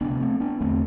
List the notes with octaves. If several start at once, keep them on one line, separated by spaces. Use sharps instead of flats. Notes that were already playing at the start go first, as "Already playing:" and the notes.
D2 C3 B3 D4
A3 C4
B3 D4
E2 D3 A3 C4